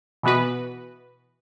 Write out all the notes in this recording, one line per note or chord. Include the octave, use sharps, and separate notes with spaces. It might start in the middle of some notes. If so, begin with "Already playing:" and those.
B2 E3 B3 F#4 B4